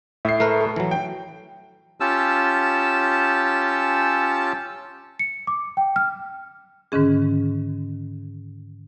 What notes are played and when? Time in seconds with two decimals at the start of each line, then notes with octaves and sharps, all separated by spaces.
0.25 A2 E5 C7
0.40 A3 A#4 B4
0.61 A4
0.76 E3 F#3
0.91 G5
2.00 C#4 F4 G4 A5 E6
5.19 C#7
5.47 D6
5.77 G5
5.96 F6
6.92 G#2 D3 D#3 C#4 G#4